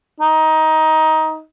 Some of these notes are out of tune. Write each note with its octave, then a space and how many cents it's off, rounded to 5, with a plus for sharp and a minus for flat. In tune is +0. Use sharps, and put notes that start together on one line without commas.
D#4 +15